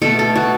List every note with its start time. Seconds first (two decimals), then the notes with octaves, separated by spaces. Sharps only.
0.02 B2 A3 A4
0.19 A4
0.36 F#4